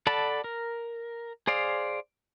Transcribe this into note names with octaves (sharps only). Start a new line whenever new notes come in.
A4 D5 F#5 A5 B5
A#4
G#4 C5 D5 F5